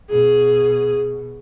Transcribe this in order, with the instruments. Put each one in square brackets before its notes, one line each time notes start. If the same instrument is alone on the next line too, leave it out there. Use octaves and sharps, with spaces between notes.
[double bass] B2 [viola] G#4